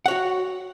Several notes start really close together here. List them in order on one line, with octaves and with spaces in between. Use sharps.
F#5 C#5 F#4